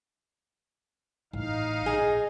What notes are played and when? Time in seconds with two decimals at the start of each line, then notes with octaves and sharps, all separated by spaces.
1.33 A1 D#4 F5
1.86 A#1 G#4 D#5